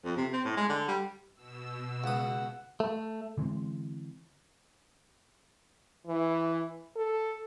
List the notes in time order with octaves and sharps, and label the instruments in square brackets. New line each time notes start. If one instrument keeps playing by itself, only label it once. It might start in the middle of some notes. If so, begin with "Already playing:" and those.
[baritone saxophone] F2
C3
C4
A2
G#3
D3
G3
[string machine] B2 E6
[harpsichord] C#2 D#6 [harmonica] F#5
[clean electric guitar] A3
[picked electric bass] D3 E3 G#3 C4
[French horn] E3
A4